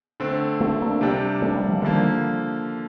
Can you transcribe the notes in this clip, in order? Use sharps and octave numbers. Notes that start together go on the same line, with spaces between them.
D3 A3 C4
A3 C4
A#3 D4
C3 G3 D4 G4
A3 C4
G3 A#3
F3 A3
D3 D#3 F3 G3 A#3